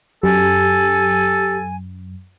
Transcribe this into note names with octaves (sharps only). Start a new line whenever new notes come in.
F#2 G4 A4 G#5